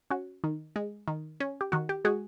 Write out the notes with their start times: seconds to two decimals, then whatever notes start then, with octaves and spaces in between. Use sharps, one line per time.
0.11 C#4 F#4
0.44 D#3
0.76 G#3
1.08 D#3
1.40 C#4
1.61 G4
1.72 D#3 F#4
1.89 G4
2.05 G#3 F#4 G#4